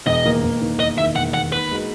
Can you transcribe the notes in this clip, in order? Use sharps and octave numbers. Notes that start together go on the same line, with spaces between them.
E1 D#5
D#2 D#3 A#3
E1
D#2 D#3 A#3
E1 D#5
D#2 D#3 A#3 E5
E1 F#5
D#2 D#3 A#3 F#5
D#2 B4
D#3 G#3 D#4 F#4